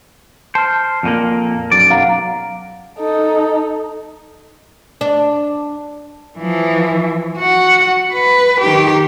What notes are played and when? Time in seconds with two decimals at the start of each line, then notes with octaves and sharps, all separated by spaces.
0.55 C5 A5 F6
1.03 F2 A#2 A#3
1.72 B1 F#2 D5
1.91 F5 F#5 A#5
2.98 D#4 A4
5.01 D4
6.39 E3 F3
7.37 F#4 F#5
8.13 B4
8.61 D#3 G4